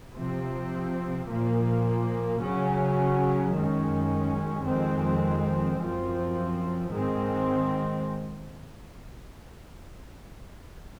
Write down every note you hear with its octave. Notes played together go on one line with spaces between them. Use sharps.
C3 F3 C4
A#2 F3 A#3
C#3 F#3 C#4
F#2 D#3 G#3 C#4
F2 D#3 G#3 C4
F#2 F3 C4
G#2 D#3 G#3 C4